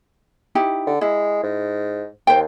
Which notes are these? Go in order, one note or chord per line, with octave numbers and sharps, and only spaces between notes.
D#4 E4 G4
D3
G#3 E4
G#2
D#2 C5 G5